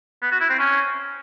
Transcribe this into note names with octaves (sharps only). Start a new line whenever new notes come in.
B3
F#4
E4
C4
C#4